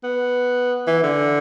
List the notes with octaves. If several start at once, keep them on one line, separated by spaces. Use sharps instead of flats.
B3
E3
D3